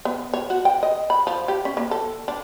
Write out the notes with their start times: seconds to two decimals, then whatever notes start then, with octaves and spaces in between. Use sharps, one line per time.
0.05 B3
0.34 C#5
0.50 F#4
0.65 G5
0.83 D#5
1.10 B5
1.27 F3
1.48 G4
1.65 C#4
1.77 A#3
1.91 A4
2.28 D4